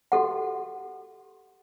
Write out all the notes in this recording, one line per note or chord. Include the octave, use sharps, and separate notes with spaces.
F#4 G4 A4 F#5